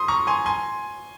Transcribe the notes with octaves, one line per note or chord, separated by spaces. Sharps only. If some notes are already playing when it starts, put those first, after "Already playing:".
Already playing: C6 D#6
A#5 C#6
G#5 C6
G#5 C6